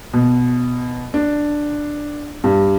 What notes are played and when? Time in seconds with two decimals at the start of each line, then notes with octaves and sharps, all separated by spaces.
0.13 B2
1.14 D4
2.44 G2